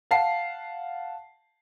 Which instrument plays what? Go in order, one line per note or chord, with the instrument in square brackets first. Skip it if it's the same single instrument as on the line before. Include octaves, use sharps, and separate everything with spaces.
[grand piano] F5 F#5 A5 C7